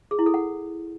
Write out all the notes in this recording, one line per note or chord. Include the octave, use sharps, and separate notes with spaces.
G#4
E4
A4
F#5